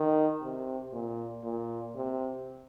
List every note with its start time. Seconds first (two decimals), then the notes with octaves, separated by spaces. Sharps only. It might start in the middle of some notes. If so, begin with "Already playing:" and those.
Already playing: D#3
0.42 C3
0.92 A#2
1.44 A#2
1.95 C3